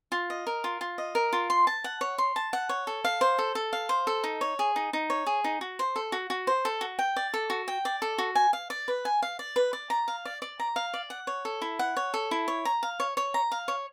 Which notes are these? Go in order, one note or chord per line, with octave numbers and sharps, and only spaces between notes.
F4
D#5
A#4
F4
F4
D#5
A#4
F4
C6
A5
F#5
C#5
C6
A5
F#5
C#5
A4
F5
C5
A4
A4
F5
C5
A4
D#4
C#5
G#4
D#4
D#4
C#5
G#4
D#4
F#4
C5
A4
F#4
F#4
C5
A4
F#4
G5
D5
A4
F#4
G5
D5
A4
F#4
G#5
F5
D5
B4
G#5
F5
D5
B4
D5
A#5
F5
D5
D5
A#5
F5
D5
F#5
C#5
A4
E4
F#5
C#5
A4
E4
C#5
A#5
F5
C#5
C#5
A#5
F5
C#5